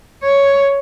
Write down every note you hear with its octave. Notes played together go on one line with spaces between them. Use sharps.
C#5